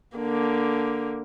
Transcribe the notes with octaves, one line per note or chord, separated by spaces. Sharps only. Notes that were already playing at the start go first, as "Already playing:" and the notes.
D3 A#3